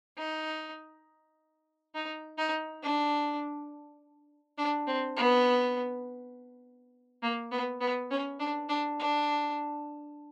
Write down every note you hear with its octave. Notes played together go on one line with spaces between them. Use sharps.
D#4
D#4
D#4
D4
D4
C4
B3
A#3
B3
B3
C#4
D4
D4
D4